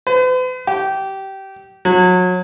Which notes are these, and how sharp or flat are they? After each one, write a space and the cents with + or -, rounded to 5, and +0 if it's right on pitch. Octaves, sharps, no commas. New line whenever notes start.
B4 +45
G4 -20
F#3 -30